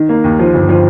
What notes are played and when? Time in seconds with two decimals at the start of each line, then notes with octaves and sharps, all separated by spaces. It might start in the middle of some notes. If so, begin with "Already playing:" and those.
Already playing: D#3
0.09 A#3
0.24 D#2
0.39 F3
0.54 G1
0.69 F3